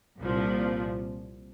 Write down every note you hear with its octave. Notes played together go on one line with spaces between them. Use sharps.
C2 A#2 F3